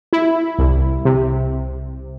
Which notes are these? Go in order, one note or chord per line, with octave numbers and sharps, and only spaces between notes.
E4
C2
C3